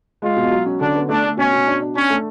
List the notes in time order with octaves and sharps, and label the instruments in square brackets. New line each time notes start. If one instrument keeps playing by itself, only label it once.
[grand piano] G#3 [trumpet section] F4
[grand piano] B2
F#3
C#4
[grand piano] D3 [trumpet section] D4
[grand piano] B3
[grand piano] A3 [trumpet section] D4
[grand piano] A3
[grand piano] B2 [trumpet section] C#4
[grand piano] B2
D4
D4
[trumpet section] C#4 [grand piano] D4
[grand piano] A3